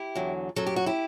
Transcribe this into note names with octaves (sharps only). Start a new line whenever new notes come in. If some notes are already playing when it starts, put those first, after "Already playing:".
Already playing: E4 G4
E2 D3 F#3
F#2 F#3 A4
G4
F#4
E4 G4